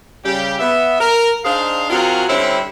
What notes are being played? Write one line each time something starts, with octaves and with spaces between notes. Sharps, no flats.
C#3 G3 G4
B3 E5
A#4
D4 D#4 G#4 C5 F5
F#3 C4 F4 F#4 G#4 A#4
D3 G3 C4 C#4 E4